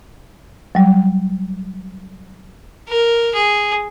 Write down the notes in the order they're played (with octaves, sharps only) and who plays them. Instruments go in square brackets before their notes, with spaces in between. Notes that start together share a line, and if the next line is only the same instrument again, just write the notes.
[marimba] F#3 G3
[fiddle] A#4
G#4